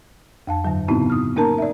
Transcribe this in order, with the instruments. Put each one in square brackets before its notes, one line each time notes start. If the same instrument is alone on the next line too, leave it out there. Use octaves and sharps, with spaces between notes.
[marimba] F2 F5 A5
G2 D3 F#3
A2 C#3 B3 C4 D#4 E4
D#6 F6
A#3 C#4 D#4 A#4 A5 A#5
D5 E5